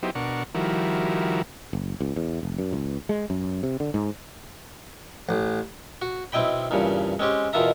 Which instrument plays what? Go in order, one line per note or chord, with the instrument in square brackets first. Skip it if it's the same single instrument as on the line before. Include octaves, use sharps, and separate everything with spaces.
[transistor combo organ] F#3 B3 D#4 E4 G4 C5
B2 D4 A#4 F#5 C#6
D#3 F3 G3 E4 F#4 A#4
[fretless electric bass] F#1
C#2
E2
F1
F#2
C#2
G#3
F#2
C3
D3
G#2
[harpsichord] A1
F#4
B1 C4 E4 D#5 G5 B5
E2 G2 A#2 C#3
G#3 C4 C#4 G4
E2 B2 D#3 F4 E5 A#5